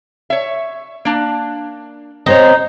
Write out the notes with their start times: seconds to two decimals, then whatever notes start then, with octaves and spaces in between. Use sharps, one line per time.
0.30 C#5 E5
1.05 A#3 D4
2.26 C4 D#4 C5 C#5